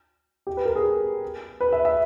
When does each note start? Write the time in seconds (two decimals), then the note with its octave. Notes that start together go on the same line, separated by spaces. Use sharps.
0.47 G4
0.57 B4
0.65 A#4
0.76 G#4
1.61 B4
1.73 E5
1.85 E5